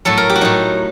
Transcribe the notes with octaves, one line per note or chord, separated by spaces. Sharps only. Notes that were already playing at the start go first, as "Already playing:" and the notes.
A2 F#3 A4
A#4
G4
F#4
A2 F#3 D#4